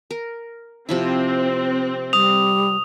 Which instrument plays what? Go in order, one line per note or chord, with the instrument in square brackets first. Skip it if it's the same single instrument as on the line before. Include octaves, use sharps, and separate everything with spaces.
[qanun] A#4
[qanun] C3 F3 E4 [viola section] C4
[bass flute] G3 [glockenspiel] D#6 F7